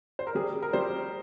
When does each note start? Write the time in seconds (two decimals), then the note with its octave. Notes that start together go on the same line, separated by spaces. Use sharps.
0.19 C5
0.27 A#4
0.35 G3 G#4
0.62 A#4
0.73 G3 C5